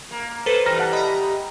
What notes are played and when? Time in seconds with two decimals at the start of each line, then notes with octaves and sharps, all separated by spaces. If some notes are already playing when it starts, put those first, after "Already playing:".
0.11 A#3
0.46 A4 B4 C5
0.66 E3 G3 A#5 F6 A#6
0.79 F#5 A5 F#6
0.93 D#5 A#5 B5